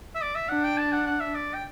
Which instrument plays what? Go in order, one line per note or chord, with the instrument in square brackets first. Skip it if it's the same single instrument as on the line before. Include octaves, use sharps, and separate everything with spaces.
[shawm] E5
D5
E5
[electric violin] D4 [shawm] F#5
[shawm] G5
A5
F#5
F#5
E5
D5
G5